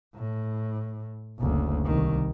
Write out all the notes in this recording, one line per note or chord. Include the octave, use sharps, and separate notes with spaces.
A2
F#1 D2
C2 D#3